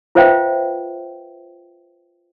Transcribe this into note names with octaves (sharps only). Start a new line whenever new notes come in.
F4 B4 C5 E5 F5 G5